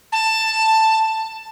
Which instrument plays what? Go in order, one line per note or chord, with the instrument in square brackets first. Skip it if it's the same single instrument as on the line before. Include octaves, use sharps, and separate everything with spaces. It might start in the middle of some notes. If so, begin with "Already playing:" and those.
[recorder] A5